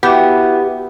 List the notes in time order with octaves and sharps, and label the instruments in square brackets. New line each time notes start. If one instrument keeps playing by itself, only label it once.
[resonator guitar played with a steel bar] B3 [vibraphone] E4 F#4 E5 [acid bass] G4